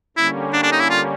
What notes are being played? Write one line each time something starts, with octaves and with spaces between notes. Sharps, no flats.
D3 G3 A#3 C#4 E4
D4
D4
D#4
E4
F4